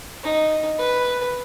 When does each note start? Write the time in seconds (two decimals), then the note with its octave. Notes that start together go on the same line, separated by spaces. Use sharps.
0.23 D#4
0.79 B4